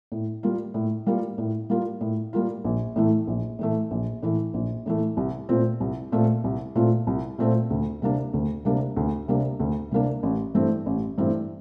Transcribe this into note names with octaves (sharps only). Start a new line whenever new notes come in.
A2
G3 A#3 F4
A2
G3 A#3 F4
A2
G3 A#3 F4
A2
G3 A#3 F4
A#1
A2 E3 A3
A#1
A2 E3 A3
A#1
A2 E3 A3
A#1
A2 E3 A3
C2
A#2 A3 C4 F4
C2
A#2 A3 C4 F4
C2
A#2 A3 C4 F4
C2
A#2 A3 C4 F4
D2
C3 G3 A#3 D4
D2
C3 G3 A#3 D4
D2
C3 G3 A#3 D4
D2
C3 G3 A#3 D4
A1
G2 E3 A3 C4
A1
G2 E3 A3 C4